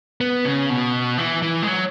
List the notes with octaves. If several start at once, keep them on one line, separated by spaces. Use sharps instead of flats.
B3
C#3
B2
E3
E3
G#3
F#3